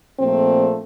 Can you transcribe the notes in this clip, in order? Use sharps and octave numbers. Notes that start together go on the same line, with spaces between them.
A#1 A#2 A3 C4